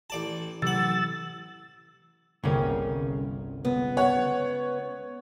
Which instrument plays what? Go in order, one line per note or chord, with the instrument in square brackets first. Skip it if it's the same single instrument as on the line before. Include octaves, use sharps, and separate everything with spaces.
[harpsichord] A1 D5 A5
[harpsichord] A1 F#5 [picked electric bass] C3 E3 F#3 [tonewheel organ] E6 A6
[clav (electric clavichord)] G1 C2 G5 [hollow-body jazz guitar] C#3 A#3 C#4
[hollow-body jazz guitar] C#2 [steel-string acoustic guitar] B3
[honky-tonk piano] C#5 F#5